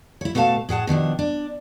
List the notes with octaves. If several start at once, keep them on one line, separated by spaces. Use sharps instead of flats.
E4 C#5
B2 A3 A4 F5 A5
A2 G#4 F#5 A5
B2 D#3 F3 D4
D4